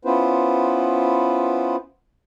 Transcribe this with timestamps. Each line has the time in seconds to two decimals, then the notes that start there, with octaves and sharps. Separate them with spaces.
0.05 B3 C#4 E4 F4 B4 C5